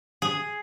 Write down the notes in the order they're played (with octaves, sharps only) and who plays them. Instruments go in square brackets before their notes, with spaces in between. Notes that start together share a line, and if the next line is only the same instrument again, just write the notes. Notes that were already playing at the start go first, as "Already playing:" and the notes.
[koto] G#4